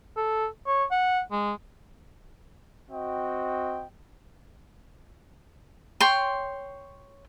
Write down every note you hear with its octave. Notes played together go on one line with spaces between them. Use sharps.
A4
C#5
F#5
G#3
C4 F#4 D#5 G5
C#5 G5 C6